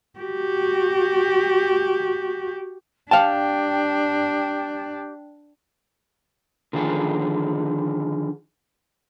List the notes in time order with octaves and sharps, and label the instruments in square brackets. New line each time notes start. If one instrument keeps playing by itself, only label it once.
[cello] F#4 G4
[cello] D4 [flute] G4 [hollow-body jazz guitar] F5 A5 [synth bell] G5
[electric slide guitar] D3 D#3 F3 G#4